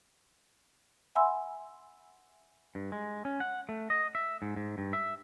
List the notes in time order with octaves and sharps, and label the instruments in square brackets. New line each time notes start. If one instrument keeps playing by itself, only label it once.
[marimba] E5 F#5 G#5 B5 C6 E6
[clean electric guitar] G2
G#3
C#4
F#5
A3
D#5
E5
G#2
G#2
G2
E5